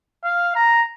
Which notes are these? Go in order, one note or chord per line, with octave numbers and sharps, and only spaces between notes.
F5
A#5